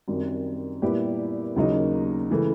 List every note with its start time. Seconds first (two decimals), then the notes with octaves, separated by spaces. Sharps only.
0.08 F#2 D#3 G3 C4
0.82 A#2 G3 B3 E4 G4
1.56 D#2 C#3 F#3 A#3 D#4
2.31 C#3 E3 A3